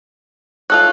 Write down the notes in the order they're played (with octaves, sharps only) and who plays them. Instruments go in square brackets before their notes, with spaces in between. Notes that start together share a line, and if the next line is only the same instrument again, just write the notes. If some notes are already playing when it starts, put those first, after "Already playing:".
[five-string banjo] F4 A4 C#5 [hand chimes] F#6